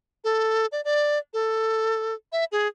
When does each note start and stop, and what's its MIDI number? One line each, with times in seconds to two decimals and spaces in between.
0.24 0.66 69
0.72 0.81 74
0.85 1.19 74
1.34 2.14 69
2.32 2.45 76
2.52 2.67 68